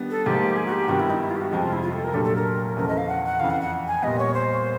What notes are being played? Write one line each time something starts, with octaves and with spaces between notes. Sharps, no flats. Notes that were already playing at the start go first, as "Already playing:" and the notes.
Already playing: D#3 G3 B3 D4
A4
G#2 F3 A#3 G4
G#4
F#4
G4
G2 D#3 G3 B3 F#4
E4
D#4
E4
F4
G4
F#4
F2 C3 F3 G#3 F#4
F4
E4
F4
A4
A#4
A#2 F#3 A3 D4 G4 A4
A4
A#4
E2 C#3 F3 A3 A#4
D#5
F5
F#5
F#5
F2 C#3 E3 F5
F#5
F#5
G#5
A#2 G3 B3 D#5
C#5
C5